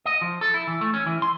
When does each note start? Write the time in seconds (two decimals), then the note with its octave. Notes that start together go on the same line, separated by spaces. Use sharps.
0.06 D#5
0.21 F3
0.41 A4
0.54 E4
0.67 E3
0.81 A3
0.94 C#4
1.06 E3
1.22 C6